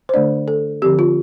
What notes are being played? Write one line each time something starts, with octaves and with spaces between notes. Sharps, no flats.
C5
D3 A3 D4 D5
A4
D3 F3 C4 G4
F4